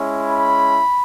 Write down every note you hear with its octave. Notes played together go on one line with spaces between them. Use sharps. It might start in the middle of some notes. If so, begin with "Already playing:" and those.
Already playing: G#3 C#4 E4
B5